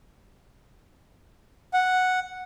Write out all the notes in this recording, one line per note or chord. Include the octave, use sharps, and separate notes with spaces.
F#5